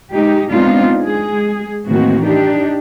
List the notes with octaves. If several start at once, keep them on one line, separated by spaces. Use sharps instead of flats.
G#3 D#4 G4
G#3 B3 C4 D4 D#4 F4
G#3 G#4
A2 D#3 E3 A#3 C4 F#4
D4 D#4 G4